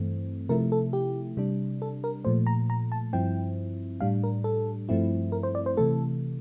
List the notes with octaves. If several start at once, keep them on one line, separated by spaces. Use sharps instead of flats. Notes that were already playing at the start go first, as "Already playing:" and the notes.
Already playing: G2 E3 A3 C4
C3 F3 A3 E4 A#4
A4
G4
C3 G3 D4
A4
A#4
A#2 F3 A3 C5
A#5
A#5
A5
G2 F3 C4 E4 G5
A2 G3 D4 F5
A#4
A4
G2 F3 A3 C4 E4
A#4
C5
D5
C5
C3 E3 A3 A4